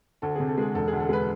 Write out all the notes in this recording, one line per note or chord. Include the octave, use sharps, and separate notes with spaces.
D2 A4
C3 G#4
A4
G#3 G#4
E1 A4
D2 G#4
A4
G#3 B4